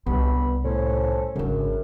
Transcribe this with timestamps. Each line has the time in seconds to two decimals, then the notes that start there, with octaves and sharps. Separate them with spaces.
0.07 C2 G2 B3 B5
0.64 A2 C#4 A4 C5
1.36 G#1 F#2 C#3 D4